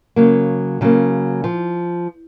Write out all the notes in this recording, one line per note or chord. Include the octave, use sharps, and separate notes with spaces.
C#3 F#3 A#3
C#3 F#3 A#3
F3